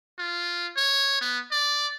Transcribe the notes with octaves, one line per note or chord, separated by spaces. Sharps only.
F4
C#5
B3
D5